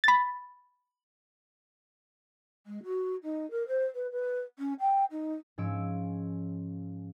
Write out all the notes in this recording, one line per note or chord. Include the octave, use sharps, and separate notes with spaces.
B5 A6
G#3
F#4
D#4
A#4
C5
B4
B4
C#4
G5
D#4
G#2 F3 C#4 C#5 E6 D7